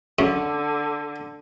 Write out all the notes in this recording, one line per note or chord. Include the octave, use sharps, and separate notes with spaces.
F#2 D3